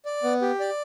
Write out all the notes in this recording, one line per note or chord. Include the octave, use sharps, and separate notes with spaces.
D5
B3
G4
D5